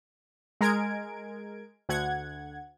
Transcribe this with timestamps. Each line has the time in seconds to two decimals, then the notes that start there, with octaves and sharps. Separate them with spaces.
0.61 G#3 A#4 G#6 D7
1.89 D2 F#5 G#6